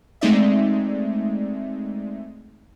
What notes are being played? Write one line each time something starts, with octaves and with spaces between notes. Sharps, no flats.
G#3 A3 C4 D#4 D5 E5